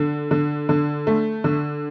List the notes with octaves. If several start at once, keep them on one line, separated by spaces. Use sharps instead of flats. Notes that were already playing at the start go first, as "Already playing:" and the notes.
Already playing: D3
D3
D3
A3
D3